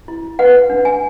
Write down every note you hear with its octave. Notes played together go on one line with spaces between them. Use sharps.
E4
B4 F#5
D4
G#5